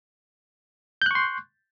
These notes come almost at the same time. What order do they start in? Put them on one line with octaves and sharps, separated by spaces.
G6 F#6 C#6 C6